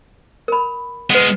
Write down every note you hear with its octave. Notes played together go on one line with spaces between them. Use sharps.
A#4 B5
G#3 B3 B4 F#5